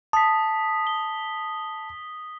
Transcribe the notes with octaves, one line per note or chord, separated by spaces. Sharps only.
A5 D#6 B6
G7